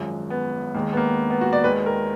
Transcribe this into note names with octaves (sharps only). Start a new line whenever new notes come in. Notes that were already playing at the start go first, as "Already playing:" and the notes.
Already playing: G#1 F#2 F3 G#3
B3
D#2 D#3 G#3 A#3
B3
A#3
B3
F#4
D5
D#2 D#3 G#3 B4
A#4